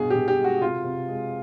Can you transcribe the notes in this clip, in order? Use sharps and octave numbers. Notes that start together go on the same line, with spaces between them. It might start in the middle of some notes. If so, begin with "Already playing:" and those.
Already playing: G2 B2 G#4
B2 G4
G4
G#3
F#4
C3 F4
C3
G#3